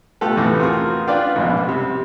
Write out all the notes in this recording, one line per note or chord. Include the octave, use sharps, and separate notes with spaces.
B2 A3 F4 G4 A4 B4
E2 A2 C3 E3
C4 F4 F#4 G#4 A#4
D4 F4 B4 D5 F5 G5
A#1 G#2 B2
C3 G3